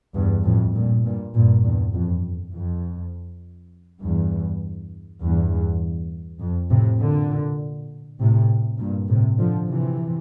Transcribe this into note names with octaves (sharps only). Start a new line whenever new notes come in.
E2 G2
F2 A2
G2 A#2
G2 A#2
G2 A#2
E2 G2
F2
F2
E2 G2
E2 G2
F2
A2 C3
A#2 D3
A2 C3
G2 A#2
A2 C3
D3 F3
C3 E3